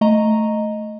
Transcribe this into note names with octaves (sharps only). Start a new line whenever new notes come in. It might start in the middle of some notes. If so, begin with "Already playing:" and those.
A3 D#5 A#5